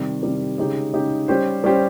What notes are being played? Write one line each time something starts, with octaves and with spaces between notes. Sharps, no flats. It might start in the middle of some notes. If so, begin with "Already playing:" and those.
Already playing: C3 D#3 G3
C3 D#3 G3
C#3 G#3 D#4 G4
C#3 G#3 D#4 G4
G3 C#4 G4 C5
G3 C#4 G4 C5